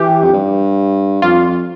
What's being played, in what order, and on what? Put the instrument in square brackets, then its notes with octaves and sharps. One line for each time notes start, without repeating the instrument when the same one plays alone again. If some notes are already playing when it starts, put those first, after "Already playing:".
Already playing: [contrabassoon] E3 [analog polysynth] G4
[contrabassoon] F2
G2
[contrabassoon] F2 [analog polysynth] F4